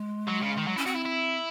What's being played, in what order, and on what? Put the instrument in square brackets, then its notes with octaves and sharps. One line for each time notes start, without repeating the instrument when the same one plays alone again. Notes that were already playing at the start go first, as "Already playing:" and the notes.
Already playing: [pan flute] G#3
[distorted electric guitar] F#3
C#3
D#3
F#3
[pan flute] C#4 [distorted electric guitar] E4
[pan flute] C4 [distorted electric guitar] F#4
[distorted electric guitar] E4
E4